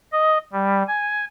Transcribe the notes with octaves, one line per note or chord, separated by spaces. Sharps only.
D#5
G3
G#5